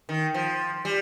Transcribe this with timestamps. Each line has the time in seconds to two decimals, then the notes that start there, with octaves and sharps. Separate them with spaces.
0.09 D#3
0.34 F3
0.85 G3